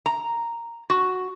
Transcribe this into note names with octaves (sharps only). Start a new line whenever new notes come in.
A#5
F#4